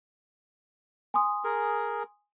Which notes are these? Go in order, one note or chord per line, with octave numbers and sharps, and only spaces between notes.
G#5 C6 D#6
G#4 A#4